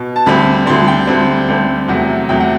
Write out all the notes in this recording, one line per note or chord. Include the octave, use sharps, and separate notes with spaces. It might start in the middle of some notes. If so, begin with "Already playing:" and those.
Already playing: B2
A5
D2 D3 G3 C4 B5
D2 D3 G3 C4 C6
G5
D2 D3 G3 C4
D2 D3 G3 C4
E2 C3 F#3 A3 F#5
E2 C3 F#3 A3 G5
F#5